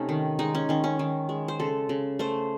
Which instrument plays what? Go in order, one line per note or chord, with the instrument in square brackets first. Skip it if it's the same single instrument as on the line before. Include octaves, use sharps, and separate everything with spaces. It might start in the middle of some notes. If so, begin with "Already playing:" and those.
Already playing: [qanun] C3 A3 C#4 D#4
D#3
G#3 D#4
C#4
D#3 C#4
C#4
D#3
G#3
C5
C#3 A4
C#3
A3 C5